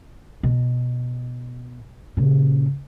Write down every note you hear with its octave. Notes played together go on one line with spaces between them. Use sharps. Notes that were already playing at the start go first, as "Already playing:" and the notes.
B2
A#2 C#3